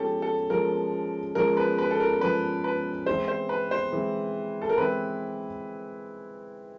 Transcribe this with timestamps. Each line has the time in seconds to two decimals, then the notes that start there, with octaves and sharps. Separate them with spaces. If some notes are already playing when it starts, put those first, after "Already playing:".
Already playing: F3 G#3 C#4 G4 A4
0.22 A4
0.50 F3 G#3 C#4 A#4
1.35 F3 G#3 C#4 A#4
1.57 B4
1.78 B4
1.91 A4
2.00 A#4
2.21 F3 G#3 C#4 B4
2.64 B4
3.06 E3 G#3 C4 E4 C5
3.28 C5
3.49 B4
3.71 C5
3.92 E3 G#3 C4 E4
4.62 A4
4.69 A#4
4.78 E3 G#3 C4 E4 B4